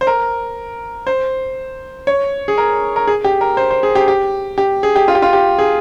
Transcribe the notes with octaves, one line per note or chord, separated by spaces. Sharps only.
C5
A#4
C5
C#5
G#4
A#4
A#4
G#4
G4
A#4
C5
C5
G#4
G4
G4
G4
G#4
G4
F4
G4
F4
G4
G#4